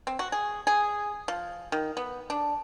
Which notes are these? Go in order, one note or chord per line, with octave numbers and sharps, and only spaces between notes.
C4
F#4
G#4
G#4
F3
D#3
B3
D4